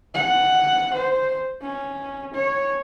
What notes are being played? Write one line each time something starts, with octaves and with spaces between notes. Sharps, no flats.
F#5
C5
C#4
C#5